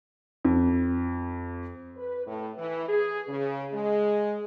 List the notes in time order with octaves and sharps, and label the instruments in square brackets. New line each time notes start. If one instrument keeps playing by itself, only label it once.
[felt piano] F2
[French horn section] B4
A2
E3
G#4
C#3
G#3